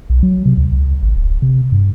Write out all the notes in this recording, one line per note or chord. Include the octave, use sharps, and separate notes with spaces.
B1
F#3
C3
D2
C#2
G#1
D1
C3
G2